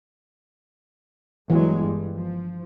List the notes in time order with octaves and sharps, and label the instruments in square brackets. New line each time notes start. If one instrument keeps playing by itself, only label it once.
[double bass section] G1 F#3 G#3 [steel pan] E3
[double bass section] G2
F3